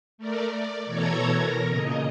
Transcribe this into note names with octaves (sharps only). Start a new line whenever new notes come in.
A3 A#4 D5
D5
B2 E3 A4 C#5 A#5 G#6
A#4 A#5
A#2 C#3 D#5